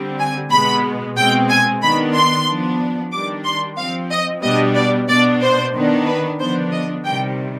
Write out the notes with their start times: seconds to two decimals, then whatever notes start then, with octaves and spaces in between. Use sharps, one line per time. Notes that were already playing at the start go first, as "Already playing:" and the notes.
Already playing: D3 G3 C4
0.19 G#5
0.50 B2 G#3 B3 B5
1.16 B2 G#3 C4 G5
1.49 G#5
1.82 D#3 B3 D4 B5
2.14 C6
2.47 F3 B3 D4
3.12 D#3 G3 D4 D6
3.44 C6
3.77 F3 C4 F5
4.10 D#5
4.43 B2 G3 B3 D4 D#5
4.75 D5
5.08 B2 B3 D4 D5
5.41 C5
5.74 D#3 B3 D4
6.06 B4
6.39 D3 F3 B3 D4 C5
6.71 D#5
7.04 C3 D#3 G3 G5